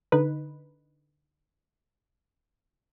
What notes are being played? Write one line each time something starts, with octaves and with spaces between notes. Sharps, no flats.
D3 D#4 B4